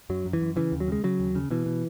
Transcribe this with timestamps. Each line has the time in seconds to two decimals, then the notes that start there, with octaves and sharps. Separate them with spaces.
0.10 F#2 F#3
0.26 F#2
0.33 E3
0.41 F#2
0.56 C#3 E3
0.72 D#2
0.80 F#3
0.88 C#3 G#3
1.04 C#3 F#3
1.20 D#2
1.35 C#3
1.51 B2 E3
1.66 B2